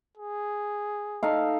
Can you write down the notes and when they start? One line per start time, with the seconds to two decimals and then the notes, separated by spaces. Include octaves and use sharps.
0.17 G#4
1.23 D#4 A4 F5